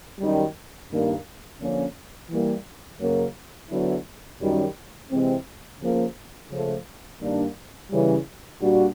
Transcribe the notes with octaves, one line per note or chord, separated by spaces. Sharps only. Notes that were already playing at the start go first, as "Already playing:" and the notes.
F#2 D#3 G3
G2 D#3 G3 A#3
D3 F3 A#3 C#4
E3 G3 A#3
F#2 C#3 F#3 A#3
D3 F#3 B3 E4
F#2 D#3 G3
C3 E3 G#3 C4
C#3 F3 A#3
C#3 F3 A3
G2 D#3 G3 A#3 D4
C#3 E3 G3
A#2 G3 A#3 D4 F#4